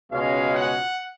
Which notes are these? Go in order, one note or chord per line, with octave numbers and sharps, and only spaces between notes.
C#2 B2 G#3 C#4 F5
F#5